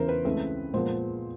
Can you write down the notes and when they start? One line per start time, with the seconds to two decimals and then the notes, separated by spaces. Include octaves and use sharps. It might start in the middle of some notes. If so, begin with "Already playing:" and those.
Already playing: E2 C#3 E3 A#4 C5
0.09 B4
0.25 C#2 C#3 E3 A3 C4
0.74 A#2 F3 G#3 B3 C5